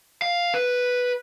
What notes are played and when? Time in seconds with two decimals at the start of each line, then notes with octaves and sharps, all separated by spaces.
0.22 F5
0.54 B4